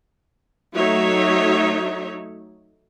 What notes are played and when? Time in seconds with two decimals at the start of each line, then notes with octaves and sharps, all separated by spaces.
0.76 F#3 A3 D#4 C#5 E5